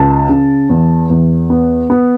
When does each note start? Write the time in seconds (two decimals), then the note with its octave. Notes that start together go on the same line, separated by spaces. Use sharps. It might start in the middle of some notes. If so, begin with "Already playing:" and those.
Already playing: C#2 A5
0.29 C#3
0.69 E2
1.10 E2
1.50 B3
1.90 B3